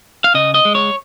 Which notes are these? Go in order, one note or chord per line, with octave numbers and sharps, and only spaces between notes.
F5
C#3 D#5
D#5
G#3
C#5